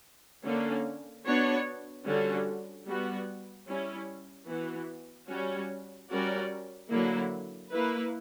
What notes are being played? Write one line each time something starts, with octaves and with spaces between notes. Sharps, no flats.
D3 A#3 C#4
B3 D4 F#4 C#5
D3 G3 C#4 F#4
G3 B3 F#4
G3 C#4 E4
E3 B3 F#4
G3 C#4 F#4
G3 C#4 F#4 A#4 D5
D3 F#3 A#3 E4
A#3 E4 B4